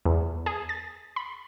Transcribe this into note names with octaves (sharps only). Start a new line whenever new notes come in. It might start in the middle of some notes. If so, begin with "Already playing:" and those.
E2
G#4
A6
B5